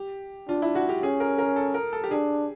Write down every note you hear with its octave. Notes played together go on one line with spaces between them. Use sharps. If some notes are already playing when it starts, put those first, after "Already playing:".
Already playing: G4
D4 F4
E4
F#4
G4
C#4 G#4
A#4
A#4
A4
A#4
A4
G4
D4 G#4